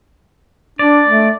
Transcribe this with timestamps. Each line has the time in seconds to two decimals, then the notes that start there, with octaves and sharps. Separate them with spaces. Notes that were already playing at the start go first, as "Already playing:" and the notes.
0.79 D4 D5
1.08 A3